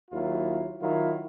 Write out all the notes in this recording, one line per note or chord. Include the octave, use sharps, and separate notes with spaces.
D#2 F#3 E4 F4
D#3 F#3 E4 F4